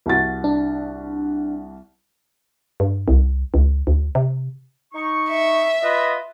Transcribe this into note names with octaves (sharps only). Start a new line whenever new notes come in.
C2 F#4 A6
D4
G2
C2
C#2
D2
C3
D#4 C#6
E5
F4 B4 D#5